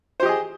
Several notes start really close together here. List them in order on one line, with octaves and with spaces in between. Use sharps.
C5 G4 D#5 G#4